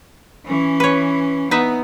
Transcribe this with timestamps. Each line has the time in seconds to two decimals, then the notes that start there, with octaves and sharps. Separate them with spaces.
0.46 E3 C#4
0.80 B4 C#5
1.51 B3 D#4 B4 E5